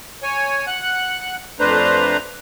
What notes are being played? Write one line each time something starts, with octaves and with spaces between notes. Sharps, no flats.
C#5 G#5
F#5 F#6
F2 A3 D4 B4 C5 A#5